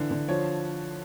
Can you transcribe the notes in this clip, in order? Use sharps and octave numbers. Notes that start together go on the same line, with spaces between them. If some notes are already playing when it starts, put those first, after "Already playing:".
Already playing: D3 E3
D3
F3 C#5